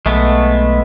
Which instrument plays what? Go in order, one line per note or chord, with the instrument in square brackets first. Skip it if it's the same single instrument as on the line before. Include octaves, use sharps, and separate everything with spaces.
[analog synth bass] B1 [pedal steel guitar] G#3 A3 B3